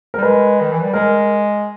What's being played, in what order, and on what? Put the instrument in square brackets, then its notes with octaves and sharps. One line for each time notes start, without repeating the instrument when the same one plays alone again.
[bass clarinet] G3 [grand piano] A#4
[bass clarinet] G#3 [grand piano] B4
[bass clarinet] D#3
E3
G3
[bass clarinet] G#3 [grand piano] A#4